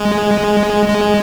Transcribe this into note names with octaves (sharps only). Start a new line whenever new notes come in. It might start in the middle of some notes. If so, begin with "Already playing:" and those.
Already playing: G#3
G#3